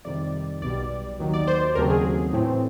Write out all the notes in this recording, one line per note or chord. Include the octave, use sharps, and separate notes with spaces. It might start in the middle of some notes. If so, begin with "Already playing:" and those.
F2 C3 D#3 G3 D5
B1 B2 G3 D5
D#2 D#3 F#3
D5
C5
C5
D#2 C#3 F#3 A3 C4 A#4
G#4
A2 E3 A3 C4